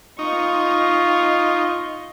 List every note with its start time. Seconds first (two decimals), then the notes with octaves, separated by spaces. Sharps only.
0.19 D#4 F4 D#5 C#6